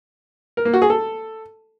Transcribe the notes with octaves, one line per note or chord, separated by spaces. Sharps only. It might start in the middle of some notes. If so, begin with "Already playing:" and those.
A#4
A#3
F#4
G#4
A4